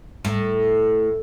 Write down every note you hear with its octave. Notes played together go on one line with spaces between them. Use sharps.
A2